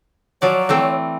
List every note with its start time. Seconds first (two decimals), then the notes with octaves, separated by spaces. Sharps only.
0.42 F3 F#3 C#5 D5
0.69 E3 A3 C4